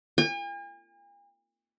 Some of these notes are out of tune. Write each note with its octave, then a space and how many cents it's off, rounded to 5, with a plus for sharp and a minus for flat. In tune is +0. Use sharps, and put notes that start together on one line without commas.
G#5 -45